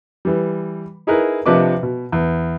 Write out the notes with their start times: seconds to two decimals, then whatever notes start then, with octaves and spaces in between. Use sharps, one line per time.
0.25 E3 G3
1.07 D#4 E4 G#4 A#4 B4
1.46 C3 F3 D4 B4 D#5 D6
1.83 B2
2.12 E2